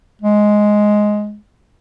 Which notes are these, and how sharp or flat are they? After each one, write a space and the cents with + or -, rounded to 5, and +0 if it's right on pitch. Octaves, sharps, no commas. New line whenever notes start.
G#3 +5